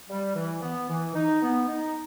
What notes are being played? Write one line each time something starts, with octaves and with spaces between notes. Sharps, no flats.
G3
E3
B3
E3
D#4
B3
D#4